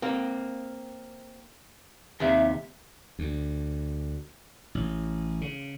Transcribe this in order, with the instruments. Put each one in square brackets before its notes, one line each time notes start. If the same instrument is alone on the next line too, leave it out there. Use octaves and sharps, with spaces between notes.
[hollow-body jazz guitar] A#3 C4
[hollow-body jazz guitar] D#2 C3 [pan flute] E5
[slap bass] D2
A1
C#3